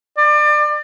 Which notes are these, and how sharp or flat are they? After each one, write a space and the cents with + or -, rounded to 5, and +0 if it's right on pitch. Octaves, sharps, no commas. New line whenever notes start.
D5 +30